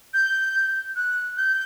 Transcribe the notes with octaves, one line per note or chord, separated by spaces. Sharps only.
G6
F#6
G6